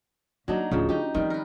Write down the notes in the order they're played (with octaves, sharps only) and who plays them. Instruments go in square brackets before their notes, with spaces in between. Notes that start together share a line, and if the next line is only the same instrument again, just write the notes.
[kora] F#3 D4 D#4 [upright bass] A#3
[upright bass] D1 [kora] C#3 F3
[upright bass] D4 [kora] D#4 G4
[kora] D#3 G3 [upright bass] F3 C4
[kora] A#4 B4